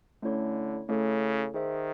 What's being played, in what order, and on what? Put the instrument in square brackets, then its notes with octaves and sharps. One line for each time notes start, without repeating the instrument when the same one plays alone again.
[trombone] D3 [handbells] A3 C#4 E4 A4 C#5
[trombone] C#3 [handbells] A3 C#4 E4 A4 C#5
[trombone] D#3 [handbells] G#4 C5 E5